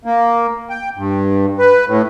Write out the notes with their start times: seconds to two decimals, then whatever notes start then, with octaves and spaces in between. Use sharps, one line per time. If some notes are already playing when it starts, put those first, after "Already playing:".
0.05 A#3
0.70 G5
0.97 G2
1.59 B4
1.88 A2